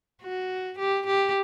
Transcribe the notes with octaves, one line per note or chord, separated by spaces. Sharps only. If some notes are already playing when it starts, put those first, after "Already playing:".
F#4
G4
G4